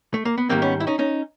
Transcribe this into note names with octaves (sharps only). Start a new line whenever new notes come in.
A3
A#3
B3
G#2 D#3 G3 A#3 C4
B3 C#4
E4
C#4 D#4
C#4 D#4